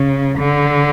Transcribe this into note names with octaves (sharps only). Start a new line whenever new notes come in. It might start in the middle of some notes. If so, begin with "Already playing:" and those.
Already playing: C#3
D3